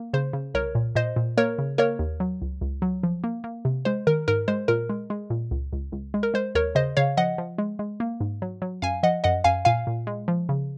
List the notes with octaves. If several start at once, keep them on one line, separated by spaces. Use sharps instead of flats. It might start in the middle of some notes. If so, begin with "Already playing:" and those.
Already playing: A#3
C#3 C5
C#3
C2 A#4 C#5
A#2
A#2 C5 D#5
A#2
A#3 A#4 C#5
C#3
A#3 A#4 C#5
D#2
F#3
C#2
C#2
F#3
F3
A#3
A#3
C3
G#3 C5
D#3 A#4
G#2 A#4
G#3 C5
A#2 A#4
G#3
G#3
A#2
C#2
C#2
C#2
G#3
A#4
G#3 C5
D#2 A#4 C#5
C#3 C5 D#5
C#3 C#5 F5
F3 D#5 F#5
F3
G#3
G#3
A#3
G#2
F#3
F#3
F#2 F5 G#5
F3 D#5 F#5
F#2 D#5 F#5
F#2 F5 G#5
A#2 F5 G#5
A#2
G#3
F3
C#3